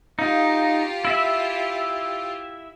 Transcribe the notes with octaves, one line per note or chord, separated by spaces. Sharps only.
D#4 F4 G4 F5
E4 E5